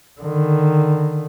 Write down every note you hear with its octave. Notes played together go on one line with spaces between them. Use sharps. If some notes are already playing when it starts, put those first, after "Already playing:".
D3 D#3